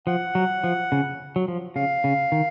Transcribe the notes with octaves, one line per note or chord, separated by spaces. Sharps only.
F3 F#5
F#3
F3
C#3
F#3
F3
C#3 F5
C#3
D#3